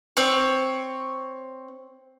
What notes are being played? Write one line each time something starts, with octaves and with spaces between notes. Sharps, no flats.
C4 C#5